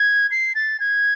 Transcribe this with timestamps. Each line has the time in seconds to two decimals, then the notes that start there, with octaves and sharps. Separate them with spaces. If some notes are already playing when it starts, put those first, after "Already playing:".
Already playing: G#6
0.31 C7
0.55 A6
0.80 G#6